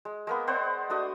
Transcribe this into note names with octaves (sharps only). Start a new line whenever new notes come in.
G#3
G#3 A#3 B3
B3 C5 D5 F#5
A3 D4 F#4 D#6